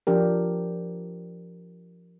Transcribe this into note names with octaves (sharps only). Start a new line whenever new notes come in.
F3 D4 G4 A#4